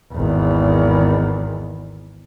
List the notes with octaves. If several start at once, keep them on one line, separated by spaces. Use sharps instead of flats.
G#1 E2